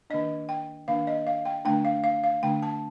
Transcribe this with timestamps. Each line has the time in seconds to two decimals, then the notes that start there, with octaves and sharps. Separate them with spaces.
0.10 D#3 A#3 D4 D#5
0.49 G5
0.88 D#3 A#3 D4 F5
1.07 D#5
1.27 F5
1.45 G5
1.65 D3 A3 D4 G5
1.85 F5
2.04 F5
2.24 F5
2.43 D3 A3 D4 G5
2.63 A5